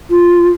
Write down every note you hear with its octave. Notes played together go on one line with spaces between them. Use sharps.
F4